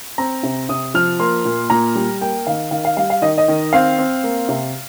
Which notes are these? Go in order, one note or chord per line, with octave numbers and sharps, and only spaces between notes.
C4 A#5
C3
C3 D#6
F3 F6
A#3 C6
A#2
A#2 A#5
G3
A#3 G5
D#3 F5
D#3 F5
F5
G3 F5
F5
D#3 D#5
D#5
D#3
C4 F5
C4
A#3
C3